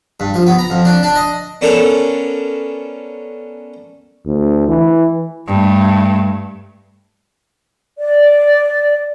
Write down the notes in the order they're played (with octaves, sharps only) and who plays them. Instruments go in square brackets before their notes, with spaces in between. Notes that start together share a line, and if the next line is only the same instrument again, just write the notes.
[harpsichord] G2
F3
B3
A#5
F2
D4
D4
D#5
B3 C#4 D4 A4 A#4
[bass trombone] D2
E3
[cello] G2 A3
[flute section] D5